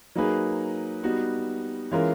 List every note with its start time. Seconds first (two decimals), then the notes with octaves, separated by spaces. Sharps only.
0.15 F#3 A#3 D#4 G#4 B4
1.03 G3 B3 D#4 F#4
1.91 E3 G#3 C#4 F4 A#4